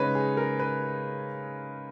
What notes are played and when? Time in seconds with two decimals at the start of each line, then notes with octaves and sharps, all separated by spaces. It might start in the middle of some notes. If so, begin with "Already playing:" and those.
Already playing: C#3 G#3 D#4 B4 C#5 D#5
0.15 G#4
0.37 A#4
0.60 B4